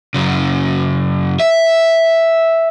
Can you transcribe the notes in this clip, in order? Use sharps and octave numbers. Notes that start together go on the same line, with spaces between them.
F#2 C#3
E5